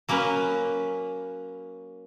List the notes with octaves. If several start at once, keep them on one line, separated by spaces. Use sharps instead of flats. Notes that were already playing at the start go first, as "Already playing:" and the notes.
F#3 A#3 C#4 B4